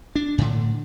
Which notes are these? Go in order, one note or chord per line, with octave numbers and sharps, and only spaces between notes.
D4
A2 D3